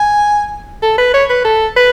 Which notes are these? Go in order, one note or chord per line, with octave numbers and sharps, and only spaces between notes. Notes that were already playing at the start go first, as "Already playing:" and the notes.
Already playing: G#5
A4
B4
C#5
B4
A4
B4